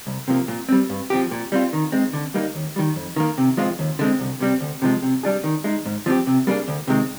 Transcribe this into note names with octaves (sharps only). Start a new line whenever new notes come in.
C2
C3 F3 A#3
A#2
G3 C4
G2
F3 C4 G4
A#2
G3 C4 F4
D#3
G#3 C4
D3
G3 A#3 D#4
D#2
D#3 G3
F2
D#3 A#3
C3
F3 G#3 C4 F4
D#2
D3 G#3 C4
C2
C3 G3 C4
D2
C3 F3 G#3
C3
G3 D4 G#4
D#3
G#3 D#4
G#2
F3 C4 G4
C3
G3 A#3 D4 G#4
D2
C3 D#3 G#3 C4